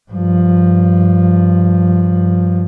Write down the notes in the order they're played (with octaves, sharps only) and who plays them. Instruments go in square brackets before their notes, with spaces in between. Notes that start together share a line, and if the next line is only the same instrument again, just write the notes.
[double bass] G2 F3